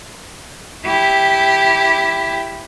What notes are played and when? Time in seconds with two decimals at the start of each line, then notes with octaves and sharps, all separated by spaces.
0.86 E4 G4